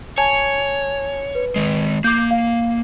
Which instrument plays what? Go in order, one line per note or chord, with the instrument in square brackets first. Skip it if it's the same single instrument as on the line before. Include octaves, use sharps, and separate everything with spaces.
[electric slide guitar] C#5 [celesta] G#5 A5 G#6
[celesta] B4
[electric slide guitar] D#3 G#3
[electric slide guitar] A#3 [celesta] D6 G6
[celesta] F5